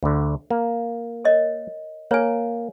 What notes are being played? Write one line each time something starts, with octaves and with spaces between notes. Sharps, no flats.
D2 D3
A#3
A#4 C#5 D#5
A#3 C#5 G#5